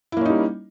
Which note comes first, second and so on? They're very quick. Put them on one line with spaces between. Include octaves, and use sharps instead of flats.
E4 A#3 C#4 D#4 G3